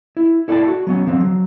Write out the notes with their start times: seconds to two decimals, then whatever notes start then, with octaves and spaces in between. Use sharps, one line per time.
0.17 E4
0.48 E4 A4 D5 F#5 G5 A5
0.68 F#4
0.87 F#3 B3 C#4
1.06 D3 F3 C4
1.20 F#3